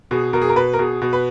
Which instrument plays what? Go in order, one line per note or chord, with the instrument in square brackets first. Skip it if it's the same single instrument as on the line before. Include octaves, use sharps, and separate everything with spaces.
[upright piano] B2 G#4
B2 A#4
G#4
A#4
B2 B4
A#4
B2 G#4
B2
B4